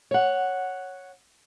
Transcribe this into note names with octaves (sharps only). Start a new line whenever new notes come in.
C#5 F#5